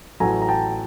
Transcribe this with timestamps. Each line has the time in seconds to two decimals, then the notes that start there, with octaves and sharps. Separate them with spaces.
0.20 A1 A2 F#3 A3 G#5 A#5
0.42 A#5
0.48 G5 A5